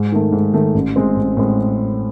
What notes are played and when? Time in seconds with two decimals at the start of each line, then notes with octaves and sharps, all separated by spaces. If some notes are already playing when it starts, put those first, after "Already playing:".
Already playing: G#2
0.12 D#3 A3
0.32 G#2
0.54 D#3 A3
0.74 A1
0.96 A2 G#3 C4
1.16 A1
1.37 A2 G#3 C4